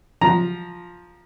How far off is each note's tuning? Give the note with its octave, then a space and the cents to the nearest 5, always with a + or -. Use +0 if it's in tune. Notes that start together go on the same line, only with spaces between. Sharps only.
F3 +5 A#5 +5